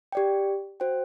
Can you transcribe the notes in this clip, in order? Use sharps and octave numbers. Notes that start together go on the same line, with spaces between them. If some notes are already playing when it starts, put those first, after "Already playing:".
G4 D5 G5
F#4 C5 G5